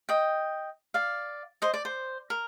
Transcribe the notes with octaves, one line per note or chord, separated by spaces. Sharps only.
D#5 G5
D5 F5
C5 D#5
D5
C5
A#4